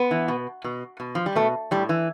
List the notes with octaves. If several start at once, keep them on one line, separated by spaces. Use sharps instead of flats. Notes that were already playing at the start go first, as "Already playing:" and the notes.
Already playing: B3
E3
B2
B2
B2
F3
G3
B2 A3
A2 G3
E3